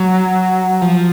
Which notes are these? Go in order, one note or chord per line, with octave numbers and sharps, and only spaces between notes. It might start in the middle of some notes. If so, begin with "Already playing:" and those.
Already playing: F#3
F3